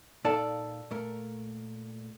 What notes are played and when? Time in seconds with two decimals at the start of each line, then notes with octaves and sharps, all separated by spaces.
0.25 A#2 D#4 A4 D5 F5 A5
0.91 A#2 A3 A#4